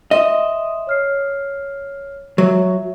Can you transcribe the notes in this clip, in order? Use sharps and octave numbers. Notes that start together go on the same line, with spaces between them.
D#5 E5 C6 E7
C#5 F6 C7
F#3 E5